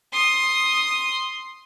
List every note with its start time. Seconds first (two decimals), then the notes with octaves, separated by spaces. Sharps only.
0.13 C6 D#6